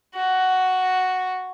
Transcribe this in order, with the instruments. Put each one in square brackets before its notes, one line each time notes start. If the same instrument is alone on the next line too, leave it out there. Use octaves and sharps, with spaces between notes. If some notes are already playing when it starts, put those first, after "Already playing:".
[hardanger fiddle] F#4